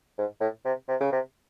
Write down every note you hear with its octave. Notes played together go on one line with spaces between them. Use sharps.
G#2
A2
C3
C3
C#3
C3